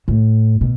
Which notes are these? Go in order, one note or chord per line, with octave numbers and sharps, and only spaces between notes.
A2
B2